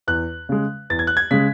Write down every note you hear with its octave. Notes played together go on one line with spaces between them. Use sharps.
E2 F#6
C#3 G#3
E2 A6
G#6
F#6
G#6
C#3 G#3 B6